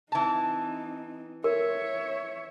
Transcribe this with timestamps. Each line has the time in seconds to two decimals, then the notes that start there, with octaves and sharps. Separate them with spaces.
0.12 E3 C4 D#4 A5
1.44 A#4 C#5 E5